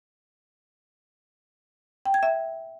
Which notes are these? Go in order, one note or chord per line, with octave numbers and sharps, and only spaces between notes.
G5
G#6
E5